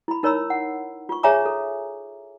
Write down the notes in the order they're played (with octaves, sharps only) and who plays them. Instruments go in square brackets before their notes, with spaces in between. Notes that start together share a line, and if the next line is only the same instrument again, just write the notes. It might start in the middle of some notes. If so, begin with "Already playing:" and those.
[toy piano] E4 B5
D#4 A#4 C#5 A#5 B5 E6
F#5
F4 C#6
G#4 C#5 E5 G#5 A#5 D6
A4